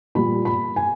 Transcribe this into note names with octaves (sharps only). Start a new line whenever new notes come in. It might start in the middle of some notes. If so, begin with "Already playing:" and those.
A#2 G3 B5
B5
G#5